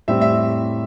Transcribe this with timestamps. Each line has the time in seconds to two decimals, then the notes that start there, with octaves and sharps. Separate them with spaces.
0.08 A2 G3 C4 E5
0.21 E5